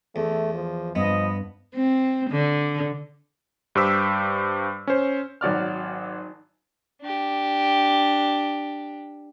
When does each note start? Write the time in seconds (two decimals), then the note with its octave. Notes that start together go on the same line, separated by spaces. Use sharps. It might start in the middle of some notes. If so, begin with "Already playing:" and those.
0.16 E2 A3
0.54 F3
0.95 G2 F3 B3 D#5
1.75 C4
2.31 D3
3.75 G2 G4 C5 D6 E6 B6
4.87 C#4 C5
5.41 G#1 F#3 D5 F6
7.02 D4 G4